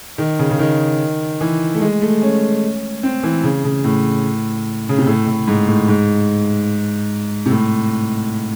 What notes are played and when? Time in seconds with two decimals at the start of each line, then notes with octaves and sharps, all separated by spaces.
0.18 D#3
0.39 C#3
0.51 C#3
0.59 D#3
1.41 E3
1.74 A3
1.81 G#3
2.02 A3
2.22 C#4
3.03 C4
3.23 E3
3.44 C#3
3.64 C#3
3.84 A2
4.89 C#3
4.98 C3
5.07 A2
5.27 A2
5.47 G#2
5.67 A2
5.88 G#2
7.46 C3
7.51 A2